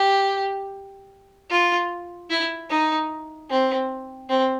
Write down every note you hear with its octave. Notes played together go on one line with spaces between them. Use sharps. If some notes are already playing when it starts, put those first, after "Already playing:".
Already playing: G4
F4
E4
D#4
C4
C4